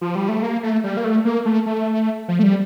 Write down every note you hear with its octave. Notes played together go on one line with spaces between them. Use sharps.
F3
G3
A3
A#3
A3
G3
A#3
A3
A#3
A3
A3
F3
A3
G3